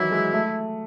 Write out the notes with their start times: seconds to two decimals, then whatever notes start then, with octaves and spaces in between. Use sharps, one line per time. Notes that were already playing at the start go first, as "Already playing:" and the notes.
Already playing: D#3 E3 F#3 E4
0.12 G#3
0.33 A3